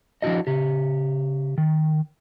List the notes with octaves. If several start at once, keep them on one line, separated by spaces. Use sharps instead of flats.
F3 D4 E4 F#4 D#5
C#3 G4
D#3